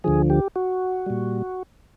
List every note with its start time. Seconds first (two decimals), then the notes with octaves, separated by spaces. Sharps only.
0.04 D2 D3 F3 G#4
0.30 G4
0.56 F#4
1.06 A#2 G3